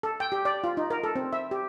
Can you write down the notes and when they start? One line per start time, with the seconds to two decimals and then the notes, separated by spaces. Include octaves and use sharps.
0.03 A4
0.20 G5
0.32 G4
0.45 D5
0.64 F4
0.77 D#4
0.90 A#4
1.04 A4
1.16 C4
1.33 E5
1.51 G4